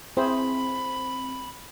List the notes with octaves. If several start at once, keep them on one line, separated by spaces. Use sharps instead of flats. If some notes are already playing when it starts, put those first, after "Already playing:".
C4 E4 G#4 C5 B5